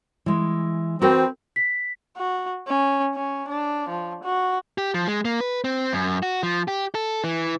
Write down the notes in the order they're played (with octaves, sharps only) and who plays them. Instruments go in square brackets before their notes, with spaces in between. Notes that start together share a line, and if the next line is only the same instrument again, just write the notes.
[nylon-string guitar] E3 G#3
[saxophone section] C4 [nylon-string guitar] F#4 A#4 B4
[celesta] B6
[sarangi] F#4
C#4
C#4
D4
F3
F#4
[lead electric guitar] G4
F3
G#3
A#3
B4
C4
F#2
F#4
F3
G4
A4
E3